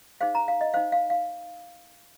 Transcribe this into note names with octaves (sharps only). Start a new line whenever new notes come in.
D#4 G#4 C5 F5
A#5
F5
D#5
D#4 C5 F5
F5
F5